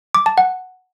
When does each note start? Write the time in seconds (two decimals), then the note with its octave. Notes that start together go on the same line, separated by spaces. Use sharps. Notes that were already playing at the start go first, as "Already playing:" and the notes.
0.15 D6
0.26 A5
0.38 F#5